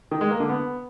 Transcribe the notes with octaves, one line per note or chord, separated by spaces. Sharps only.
D#3
G#3
A#3
D3
B3